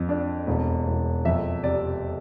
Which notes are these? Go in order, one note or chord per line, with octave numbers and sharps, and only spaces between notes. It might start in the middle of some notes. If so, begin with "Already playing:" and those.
Already playing: F2
D4
E1
E1
F2 E5
C3 D5